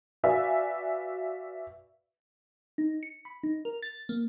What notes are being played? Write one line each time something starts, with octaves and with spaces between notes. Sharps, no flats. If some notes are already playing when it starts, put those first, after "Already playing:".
F#4 B4 D5 E5 F5 G#5
D#4
C#7
B5
D#4
A#4
A6
A#3